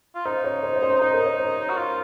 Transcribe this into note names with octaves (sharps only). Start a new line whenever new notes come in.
F4
D#4 C5
C#5
C5
C#5
C5
D#4 C5
A#4
C#5
C5
F#4
F4